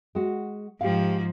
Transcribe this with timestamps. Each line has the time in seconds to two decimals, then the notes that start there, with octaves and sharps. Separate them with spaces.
0.15 G#3 F#4
0.81 G#2 F3 G4 F5